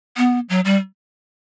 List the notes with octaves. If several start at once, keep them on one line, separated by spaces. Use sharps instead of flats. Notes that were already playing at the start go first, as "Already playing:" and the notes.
B3
F#3
G3